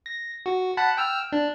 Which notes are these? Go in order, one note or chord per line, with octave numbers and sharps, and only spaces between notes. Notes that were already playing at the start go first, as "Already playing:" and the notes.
A#6
F#4
F#5 A5 B5
G5 E6 F6
D4